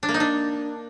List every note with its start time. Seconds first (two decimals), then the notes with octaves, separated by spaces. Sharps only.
0.03 D4
0.09 A#3
0.14 D#4
0.20 D4